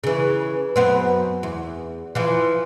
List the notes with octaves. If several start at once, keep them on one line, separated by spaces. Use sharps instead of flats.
C#3 E3
F#2 B3 C4
E2
E3 F3